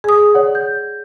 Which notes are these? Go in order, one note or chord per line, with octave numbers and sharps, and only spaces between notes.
G#4 G#5 D#6
C#5 D5 F#5
G6